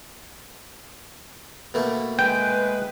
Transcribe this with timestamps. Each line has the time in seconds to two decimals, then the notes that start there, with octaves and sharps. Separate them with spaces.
1.74 B2 A3 A#3
2.19 G#3 B4 G5